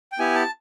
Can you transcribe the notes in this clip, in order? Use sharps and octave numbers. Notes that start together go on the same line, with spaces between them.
G5
B3 E4 G4 G#5
A5